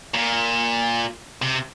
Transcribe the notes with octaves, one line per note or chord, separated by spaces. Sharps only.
A#2
C3